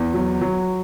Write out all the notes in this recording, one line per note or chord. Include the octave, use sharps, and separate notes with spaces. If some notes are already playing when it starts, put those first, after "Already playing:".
Already playing: E2
F#3
F#3